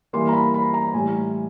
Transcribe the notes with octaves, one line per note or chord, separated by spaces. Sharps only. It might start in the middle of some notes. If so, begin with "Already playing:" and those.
E3 G3 A#3 C6
A#5
B5
B5
A#5
A2 E3 G3 G#5